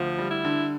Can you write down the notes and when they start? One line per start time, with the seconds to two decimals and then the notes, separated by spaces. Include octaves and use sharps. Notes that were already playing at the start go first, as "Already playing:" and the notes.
Already playing: D2 F3
0.18 G3
0.31 E4
0.45 D3